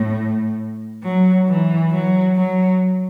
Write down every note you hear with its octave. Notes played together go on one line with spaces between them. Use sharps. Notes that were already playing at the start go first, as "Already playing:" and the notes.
Already playing: A2
F#3
E3
F#3
F#3